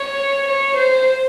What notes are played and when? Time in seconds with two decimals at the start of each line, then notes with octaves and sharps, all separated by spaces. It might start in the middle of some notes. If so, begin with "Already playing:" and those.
Already playing: C#5
0.48 C#5
0.77 C5